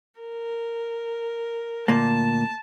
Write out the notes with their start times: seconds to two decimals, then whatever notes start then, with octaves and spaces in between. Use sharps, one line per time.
0.20 A#4
1.88 D2 A#2 A#3 A5